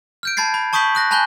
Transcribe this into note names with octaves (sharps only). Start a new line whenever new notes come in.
F6 G6 D7
A5 B5 G#6 A6 C7
B5
A5 C#6 D#6 G6 B6 F#7
D#6 F#6 A#6
G#5 A5 B5 F#6 G6 G7